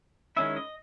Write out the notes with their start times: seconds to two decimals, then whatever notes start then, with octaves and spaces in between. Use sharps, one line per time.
0.37 D#3 G#3 C#4 E4 E5
0.56 D#5